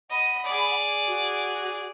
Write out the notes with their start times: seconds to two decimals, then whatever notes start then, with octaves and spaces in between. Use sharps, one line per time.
0.10 D#5 F#5 B5 D#6
0.45 G#4 D5
1.07 F#4